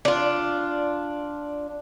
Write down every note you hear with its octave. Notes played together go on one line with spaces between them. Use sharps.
D4 F4